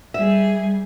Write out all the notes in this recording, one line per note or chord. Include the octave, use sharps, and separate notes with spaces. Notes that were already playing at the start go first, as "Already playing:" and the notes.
G3 G#4 E5